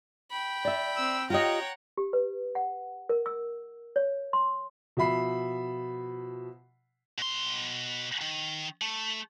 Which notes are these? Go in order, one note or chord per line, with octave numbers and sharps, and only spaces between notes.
G5 B5
D5 E5
C4 E6
F4 G4 C#5 D#5 F#5 G5 A#5
G4
B4
F#5
A#4
E6
C#5
C6
B2 F3 E5 B5 C7
B2 C6
D#3
A3